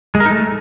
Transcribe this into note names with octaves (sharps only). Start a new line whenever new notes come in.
G#3
A#4
D#4
A3